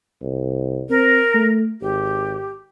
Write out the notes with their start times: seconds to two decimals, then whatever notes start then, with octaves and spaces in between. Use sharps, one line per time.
0.22 C2
0.90 C4 A#4
1.34 A3
1.81 G#1 G4